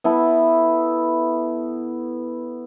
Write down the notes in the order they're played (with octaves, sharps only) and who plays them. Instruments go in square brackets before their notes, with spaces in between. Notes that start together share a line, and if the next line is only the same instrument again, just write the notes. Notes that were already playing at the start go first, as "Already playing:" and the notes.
[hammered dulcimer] B3 E4 A4